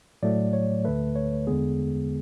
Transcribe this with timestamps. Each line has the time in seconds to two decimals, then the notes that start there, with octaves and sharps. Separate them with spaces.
0.23 A2 F#3 A3 D5
0.53 C#5
0.84 D2 D3 A3 B4
1.16 C#5
1.47 E2 D3 G#3 B3 G#4